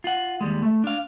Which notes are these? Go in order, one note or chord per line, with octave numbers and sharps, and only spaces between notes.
F4 F#5
D#2 G3 G#3
A3
D4 F5